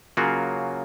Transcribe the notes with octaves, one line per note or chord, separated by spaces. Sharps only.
C#3 F#3 A#3 F4 F#4